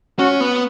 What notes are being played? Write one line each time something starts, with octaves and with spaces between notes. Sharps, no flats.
C#4 F#4
B3